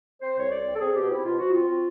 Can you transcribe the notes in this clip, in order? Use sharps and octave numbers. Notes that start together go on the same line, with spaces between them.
C4 C5
C2 C#5
C4 D5
C4
A4
C4 G#4
B2 G4
C4 E4
B2 F4
F3 F#4
C4 F4
C4